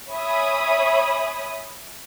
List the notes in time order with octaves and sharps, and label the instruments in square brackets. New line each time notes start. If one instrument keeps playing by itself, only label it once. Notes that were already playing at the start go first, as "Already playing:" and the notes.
[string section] C#5 E5 G#5 B5 D#6